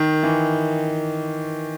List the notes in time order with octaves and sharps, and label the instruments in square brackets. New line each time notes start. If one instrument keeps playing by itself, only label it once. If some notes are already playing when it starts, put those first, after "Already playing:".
Already playing: [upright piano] D#3
E3